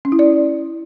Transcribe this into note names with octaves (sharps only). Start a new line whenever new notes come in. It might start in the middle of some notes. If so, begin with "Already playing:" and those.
C#4
E4
D5